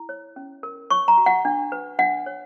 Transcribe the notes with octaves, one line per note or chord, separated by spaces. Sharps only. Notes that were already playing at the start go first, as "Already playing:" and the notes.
Already playing: E4
C#5
C#4
A#4
C#5 C#6
A#5
F#4
F#5
D4
B4
D4 F#5
C#5